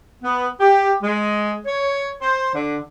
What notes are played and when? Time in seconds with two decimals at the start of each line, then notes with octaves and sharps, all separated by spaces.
0.23 B3
0.60 G4
1.02 G#3
1.66 C#5
2.21 C5
2.54 D3